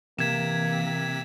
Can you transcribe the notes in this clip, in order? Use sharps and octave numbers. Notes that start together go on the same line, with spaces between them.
C3 E3 A#3 G#6 B6 E7